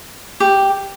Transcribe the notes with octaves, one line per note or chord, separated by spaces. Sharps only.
G4